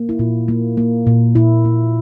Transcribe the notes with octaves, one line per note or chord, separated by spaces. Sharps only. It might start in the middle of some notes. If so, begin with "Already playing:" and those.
Already playing: A#3
E4
A#2 F4
A#3
A#3
A#2
A#2 E4
A#2